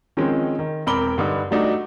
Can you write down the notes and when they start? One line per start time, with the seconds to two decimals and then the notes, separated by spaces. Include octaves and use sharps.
0.17 D#3 F3 G#3 C4 C#4
0.59 D#3
0.86 E1 C4 A#4 B5 D6 G7
1.18 G2 D3 D#4
1.51 F#3 G3 A3 D4 D#4 F#4